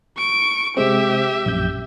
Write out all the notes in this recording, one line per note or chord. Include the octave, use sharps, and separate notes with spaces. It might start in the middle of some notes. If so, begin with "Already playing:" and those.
C#6 D7
C3 G#3 C4 G4 E5
A#1 F#2 G6